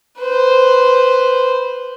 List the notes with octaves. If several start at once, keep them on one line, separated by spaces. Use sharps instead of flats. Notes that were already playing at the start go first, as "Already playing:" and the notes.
B4 C5